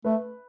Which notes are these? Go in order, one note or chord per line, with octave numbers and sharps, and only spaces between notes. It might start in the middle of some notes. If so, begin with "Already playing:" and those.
A3 B4